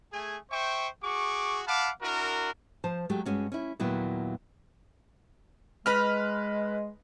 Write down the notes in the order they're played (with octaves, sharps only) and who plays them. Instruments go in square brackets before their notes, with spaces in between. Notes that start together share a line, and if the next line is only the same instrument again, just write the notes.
[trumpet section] A3 G#4 G#5
C5 E5 G5 C#6
F#4 G#4 C#6 D6
F5 F#5 A5 B5 D6
D4 E4 F#4 A#4
[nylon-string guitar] F3 C5 A5
F#3 G#3 A3 G4
G2 G#3 C#4 F#4
C#4 E4
D#2 A#2 F#3 B3 E4
[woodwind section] G#3 [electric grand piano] B4 F6 [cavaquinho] D#5 B5